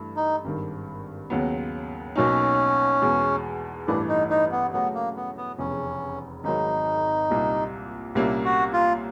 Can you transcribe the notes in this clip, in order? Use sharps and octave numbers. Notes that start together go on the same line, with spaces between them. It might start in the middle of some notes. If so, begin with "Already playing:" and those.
Already playing: G2 E3 A3
D#4
G#1 G2 D#3
D#2 C#3 F#3 B3
B1 B2 F#3 A#3 C#4 D#4
E2 B2 G#3
A1 G2 E3 A3 D4
D#4
D#4
B3
C#3 F#3 A3 B3 C#4 F#4
A#3
B3
B3
F1 E2 C#3 C#4
G#1 G#2 D#3 F#3 D#4
C2 A#2 G3
C2 A#2 G3 A#3 C#4 E4
F#4
F4